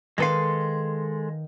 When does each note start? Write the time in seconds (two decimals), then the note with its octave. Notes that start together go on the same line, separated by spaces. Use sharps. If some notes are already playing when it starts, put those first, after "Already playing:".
0.18 D#3 G#3 A4 B4 F5 C6